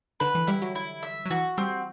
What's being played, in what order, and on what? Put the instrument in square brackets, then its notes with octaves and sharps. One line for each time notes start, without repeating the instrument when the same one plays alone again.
[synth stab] D3 [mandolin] B4
[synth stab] E3
[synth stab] G3 [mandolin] E4
[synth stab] F#3
[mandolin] E4
E5
[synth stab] F#3
[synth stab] E3 [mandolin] F#4
[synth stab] G3 [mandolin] C4